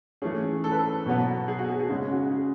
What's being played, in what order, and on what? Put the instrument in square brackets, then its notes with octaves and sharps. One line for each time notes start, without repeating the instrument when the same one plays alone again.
[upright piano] E3 A3 C#4 G#4
A4
B4
A4
B2 F#3 B3
G#4
F#4
G#4
G#4
C#3 G#3 C#4 F#4
F#4
G#4